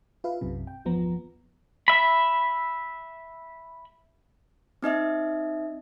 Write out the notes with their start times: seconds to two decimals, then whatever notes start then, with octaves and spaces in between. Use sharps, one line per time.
0.24 F4 B4 E5 F5
0.41 B1 F#2 C3
0.67 G5
0.85 G1 E2 F3 B3 A#5
1.88 E5 B5
4.82 C4 D#4 D#5 E5